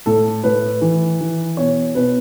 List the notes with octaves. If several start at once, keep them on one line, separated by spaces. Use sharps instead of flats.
A2 A4
A2 B4
E3
E3
B2 C#5
B2 B4